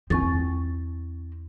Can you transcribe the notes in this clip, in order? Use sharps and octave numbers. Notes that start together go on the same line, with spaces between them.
E2 C4 C#6 A6